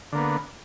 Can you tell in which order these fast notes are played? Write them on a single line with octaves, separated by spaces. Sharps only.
D3 A#3 B3